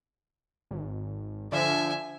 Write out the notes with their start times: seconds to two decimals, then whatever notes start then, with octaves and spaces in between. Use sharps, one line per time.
0.71 G#1
1.52 D3 F3 E5 G#5